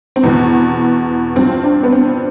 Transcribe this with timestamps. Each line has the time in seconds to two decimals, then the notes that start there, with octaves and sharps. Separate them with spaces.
0.16 C4
0.23 E2 B2 B3
1.36 G2 F3 C4
1.64 D4
1.84 B3
1.92 C4